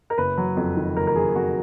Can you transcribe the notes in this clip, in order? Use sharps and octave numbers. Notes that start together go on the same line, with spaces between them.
A#4
F#1 B4
F#3
F2
D#3
F#1 A#4
A#4
F#3 G#4
F2 F#4